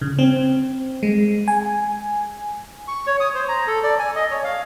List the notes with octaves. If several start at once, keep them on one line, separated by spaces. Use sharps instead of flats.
C#3
C4
G#3
G#5
C#6
C#5
D#6
C5
A#5
A4
D5
G#5
D#5
C#5
F5